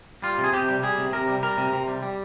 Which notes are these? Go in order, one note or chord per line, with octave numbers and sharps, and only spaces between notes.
G3 F4
C3
G#4
C3 G4
G3
G3 G#4
C3
C3 A#4
G3
G3 A#4
C3
C3
G3
G3